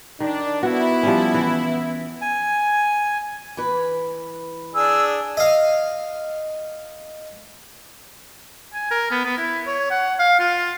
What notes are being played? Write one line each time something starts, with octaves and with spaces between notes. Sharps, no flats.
D#3 D4
B3 E4 F#4
F3 G3 C#4
E3
G#5
E3 B4
D4 G#4 E6
D#5 F5
G#5
A#4
B3
B3
E4
C#5
F#5
F5
F4